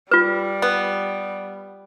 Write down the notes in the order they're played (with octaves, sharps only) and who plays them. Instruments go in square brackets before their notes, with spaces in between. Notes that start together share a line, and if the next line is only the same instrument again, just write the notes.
[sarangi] G3 [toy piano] F4 B4
[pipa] B3